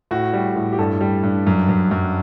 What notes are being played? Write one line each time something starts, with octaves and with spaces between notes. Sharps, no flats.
A2 F#4
G3
A2
G4
G2 A4
G3
G2
F#2
F#2
F#2